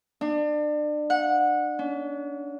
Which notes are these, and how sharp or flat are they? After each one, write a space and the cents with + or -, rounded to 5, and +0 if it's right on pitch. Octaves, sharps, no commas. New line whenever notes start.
D4 +30
F#5 -20
C#4 +45